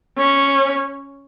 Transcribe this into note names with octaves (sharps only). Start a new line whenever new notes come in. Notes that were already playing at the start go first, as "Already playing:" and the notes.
C#4